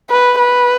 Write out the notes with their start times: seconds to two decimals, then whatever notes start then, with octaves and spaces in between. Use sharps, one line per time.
0.10 B4
0.39 B4